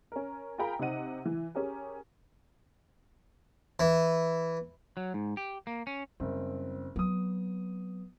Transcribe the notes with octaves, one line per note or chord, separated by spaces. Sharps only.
C#4 A#4
F4 G#4 A#4 G5 A#5 B5
C3 D#4 C5 D#5 F#5 D#7
E3
C#4 G4 G#4 A#4
E3
F#3
G#2
G4
A#3
C#4
F#1 G3 C4
F#3 B3 C4 D#6